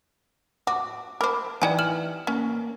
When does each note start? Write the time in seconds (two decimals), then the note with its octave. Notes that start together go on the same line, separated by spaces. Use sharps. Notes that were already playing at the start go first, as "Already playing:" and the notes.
0.67 F#4 D6
1.21 A#4 C5 B5 D6
1.62 E3 D#4 G4 D5 G5 G#5
1.79 F6 E7 F#7
2.27 A#3 C#4